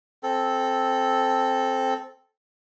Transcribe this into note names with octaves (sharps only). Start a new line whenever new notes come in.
C4 A4